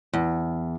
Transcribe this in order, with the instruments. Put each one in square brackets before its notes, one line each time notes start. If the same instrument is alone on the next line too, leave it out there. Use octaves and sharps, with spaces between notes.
[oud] E2